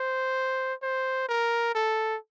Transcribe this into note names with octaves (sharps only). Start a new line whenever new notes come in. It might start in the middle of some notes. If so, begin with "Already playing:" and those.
Already playing: C5
C5
A#4
A4